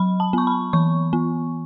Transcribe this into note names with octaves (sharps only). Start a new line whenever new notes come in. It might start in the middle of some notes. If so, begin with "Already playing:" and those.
Already playing: F#3 B5
A5
B3 C#6
B5
E3 C#6
B3